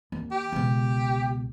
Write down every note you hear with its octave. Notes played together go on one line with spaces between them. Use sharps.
D#2
G4
C#2 B2